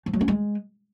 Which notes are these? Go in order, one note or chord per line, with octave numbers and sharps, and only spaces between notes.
F3
F#3
C#4
G#3